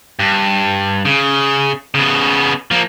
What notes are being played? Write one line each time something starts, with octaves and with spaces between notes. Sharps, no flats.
G2
C#3
C#3 B3
F3 A#3